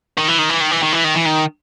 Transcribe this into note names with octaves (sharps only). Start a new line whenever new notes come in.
D#3
E3
D#3
E3
D#3
E3
D#3
E3
D#3
E3
D#3